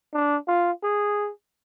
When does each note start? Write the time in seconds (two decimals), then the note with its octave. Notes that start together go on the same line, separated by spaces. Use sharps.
0.14 D4
0.48 F4
0.83 G#4